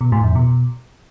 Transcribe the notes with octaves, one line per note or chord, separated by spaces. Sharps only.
B2
A2
F2
B2